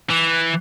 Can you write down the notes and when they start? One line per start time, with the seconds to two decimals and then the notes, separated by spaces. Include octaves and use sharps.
0.10 E3